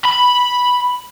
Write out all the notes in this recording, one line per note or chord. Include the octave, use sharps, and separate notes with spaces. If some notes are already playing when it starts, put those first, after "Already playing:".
B5